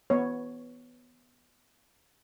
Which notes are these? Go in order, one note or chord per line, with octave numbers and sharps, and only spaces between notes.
B3 C#5